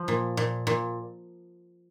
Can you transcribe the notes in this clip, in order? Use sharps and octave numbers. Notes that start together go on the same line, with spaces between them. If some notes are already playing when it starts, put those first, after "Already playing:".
Already playing: F3
A#2
A#2
A#2